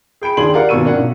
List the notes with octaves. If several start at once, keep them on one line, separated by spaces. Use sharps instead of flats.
G#4 G5 B5 D7
D#2 D4 G#4 G5 C6 F#7
G4 A#4 D5 F5 F#5
G#1 B2 B3 C#6 E6 D#7
A#3 C#4 D4 F#5
B1